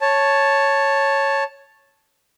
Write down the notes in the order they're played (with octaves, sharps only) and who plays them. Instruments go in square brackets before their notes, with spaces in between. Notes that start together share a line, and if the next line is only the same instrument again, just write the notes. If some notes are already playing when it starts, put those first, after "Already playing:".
[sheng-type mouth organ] C#5 A5